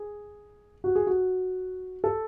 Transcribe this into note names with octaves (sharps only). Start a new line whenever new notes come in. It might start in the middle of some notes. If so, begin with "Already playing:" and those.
Already playing: G#4
F#4
G#4
F#4
A4